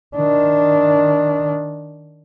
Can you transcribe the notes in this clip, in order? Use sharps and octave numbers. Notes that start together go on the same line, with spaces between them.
D#3 D4